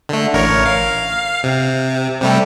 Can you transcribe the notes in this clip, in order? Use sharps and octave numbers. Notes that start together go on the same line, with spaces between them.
D3 A3
A1 A#4 C#5
F5
C3
C3 G3 A3